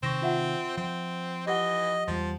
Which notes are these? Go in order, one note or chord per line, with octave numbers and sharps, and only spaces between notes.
C3 D#3 C4 C#6 A#6 E7
F4 E5 F#5
F3 C4
E3 G4 D#5 F#5 G7
E2 F3 G3